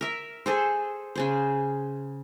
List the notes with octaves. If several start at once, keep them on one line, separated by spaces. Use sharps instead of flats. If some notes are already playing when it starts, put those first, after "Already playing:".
A#4 E5
G#4 A4 C5
C#3 G#4 C5